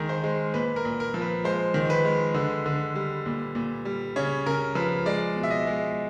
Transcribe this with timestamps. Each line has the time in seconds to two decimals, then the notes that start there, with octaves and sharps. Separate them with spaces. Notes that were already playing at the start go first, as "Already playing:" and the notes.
Already playing: D#3 G#3 A#4
0.09 C5
0.24 G#3
0.54 A#2 B4
0.76 A#4
0.85 A#2
1.00 A#4
1.14 F3
1.21 B4
1.44 G#3 C5
1.74 D#3
1.90 B4
2.05 G#3
2.34 D3
2.66 D3
2.95 G3
3.26 A#2
3.55 A#2
3.85 G3
4.16 C#3 C#5
4.46 C#3 A#4
4.75 F3 B4
5.06 G#3 D5
5.36 B2
5.43 E5
5.51 D#5
5.67 G#3